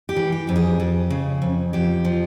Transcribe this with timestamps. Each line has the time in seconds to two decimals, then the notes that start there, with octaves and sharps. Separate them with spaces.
0.09 G4
0.16 E3
0.32 G4
0.47 F2 G4
0.56 G#4
0.80 F2 G4
1.10 C#3
1.42 F2
1.73 F2 G4
2.05 F3